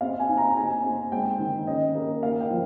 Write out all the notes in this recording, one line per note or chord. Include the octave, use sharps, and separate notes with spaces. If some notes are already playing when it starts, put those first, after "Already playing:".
C4 F5
G#5
D#4
A#5
D#4 G#5
C4
G#3 G5
D#3
C#4 D#5
A#3
A#3 F5
G5
F3